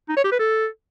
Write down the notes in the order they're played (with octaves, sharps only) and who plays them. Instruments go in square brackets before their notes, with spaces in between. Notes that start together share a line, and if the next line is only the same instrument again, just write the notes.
[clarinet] D#4
C#5
G4
B4
A4